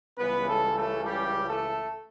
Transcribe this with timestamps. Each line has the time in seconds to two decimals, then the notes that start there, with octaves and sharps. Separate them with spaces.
0.18 C#2 C#3 E3 G3 B3 B4
0.47 A3 A4
0.75 A3 A4
1.04 G3 G4
1.47 A3 A4